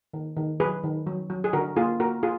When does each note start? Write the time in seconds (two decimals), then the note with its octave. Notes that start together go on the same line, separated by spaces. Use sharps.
0.13 D#3
0.36 D#3
0.60 F#3 G#4 B4
0.84 D#3
1.07 F#3
1.30 F#3
1.44 G#4
1.53 D3 F#4 A#4
1.77 A#3 F4 G#4
2.00 A#3 F#4 A#4
2.23 F4 G#4